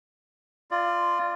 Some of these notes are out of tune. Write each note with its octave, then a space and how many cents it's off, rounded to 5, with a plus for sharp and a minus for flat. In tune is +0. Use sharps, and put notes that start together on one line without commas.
F4 -10 D5 +20